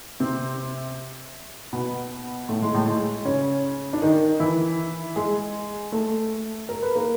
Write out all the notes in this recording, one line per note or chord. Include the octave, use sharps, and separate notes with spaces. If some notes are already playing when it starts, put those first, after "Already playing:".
C3 C4
B2 B3
A2 A3
G#3
A2 A3
G#3
C#3 C#4
D4
D#3 D#4
E3 E4
G#3 G#4
A3 A4
A#4
B4
A#3 A#4